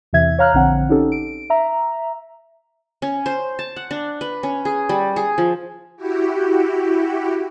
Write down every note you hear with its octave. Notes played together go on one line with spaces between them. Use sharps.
E2 C3 E3 E5 G#6
C#5 F5 A#5 F6 F#6
A#1 D3 C4 F#5
C#4 D#4 G4 A4
D7
E5 A#5
C#4
C5
A5
F#5
D4
B4
C#4
G#4
G3
G#4
F3
E4 F#4 G4